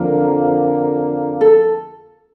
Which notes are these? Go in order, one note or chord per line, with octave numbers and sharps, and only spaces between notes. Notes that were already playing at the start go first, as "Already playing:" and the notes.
Already playing: F2 D3 F3 A#3 A#4
A4